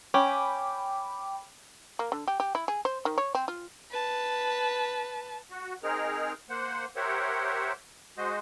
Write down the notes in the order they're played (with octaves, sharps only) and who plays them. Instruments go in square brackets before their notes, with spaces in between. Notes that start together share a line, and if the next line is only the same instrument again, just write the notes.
[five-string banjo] C#4 [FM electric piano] G5 B5 D6
[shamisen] A#3
D3
G4
G4
E4
G#4
C5
D#3
C#5
C4
F4
[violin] B4 A5
[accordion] F#4
C4 D#4 G#4 A#4 F6
A#3 C5 F#5
G4 A#4 C5 C#5 E5 F#5
G#3 F#4 C5 D#5